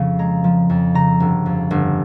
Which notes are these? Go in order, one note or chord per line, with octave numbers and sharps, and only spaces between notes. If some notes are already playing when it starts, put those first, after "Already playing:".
Already playing: F2 C#3 F3 F5
G#3 A#5
F3
F2
C#3 A#5
G1
F2
G1